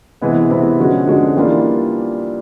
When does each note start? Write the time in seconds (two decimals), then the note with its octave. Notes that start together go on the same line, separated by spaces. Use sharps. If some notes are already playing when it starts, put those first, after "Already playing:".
0.21 C3 E3 G#3 B3
0.50 C3 E3 G#3 B3
0.79 D3 F3 G#3 C#4 F#4
1.07 D3 F3 G#3 C#4 F#4
1.37 E3 G3 A#3 D4 F4